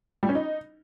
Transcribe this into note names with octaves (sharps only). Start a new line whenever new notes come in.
G3
C#4
D#4